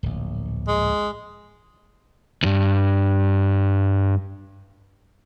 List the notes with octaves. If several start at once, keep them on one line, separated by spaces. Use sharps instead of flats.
D1 A#1
G#3
D2 G2